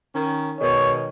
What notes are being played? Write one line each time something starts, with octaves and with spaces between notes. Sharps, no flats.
D#3 C#4
B2 D#3 G#3 C#5